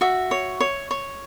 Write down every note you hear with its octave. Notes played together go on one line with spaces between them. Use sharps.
F#4 E5
C#5
C#5
C#5